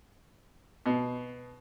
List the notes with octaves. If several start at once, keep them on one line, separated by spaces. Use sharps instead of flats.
B2